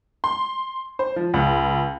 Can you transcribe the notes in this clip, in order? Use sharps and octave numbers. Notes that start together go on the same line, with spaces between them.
C6
C5
F3
C#2